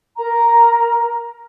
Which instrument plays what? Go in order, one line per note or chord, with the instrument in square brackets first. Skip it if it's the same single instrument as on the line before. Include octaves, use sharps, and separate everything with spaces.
[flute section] A#4 A#5